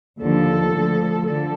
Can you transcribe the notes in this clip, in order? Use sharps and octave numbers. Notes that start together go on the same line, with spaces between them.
D#2 D3 F3 A4
D2 D3 F3
D3 F3 A4